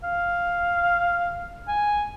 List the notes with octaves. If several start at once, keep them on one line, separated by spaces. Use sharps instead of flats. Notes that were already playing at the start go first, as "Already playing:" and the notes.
F5
G#5